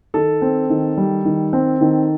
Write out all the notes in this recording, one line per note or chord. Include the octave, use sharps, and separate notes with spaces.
D#3 A4
C4
D#3
G3
D#3
C4
D#3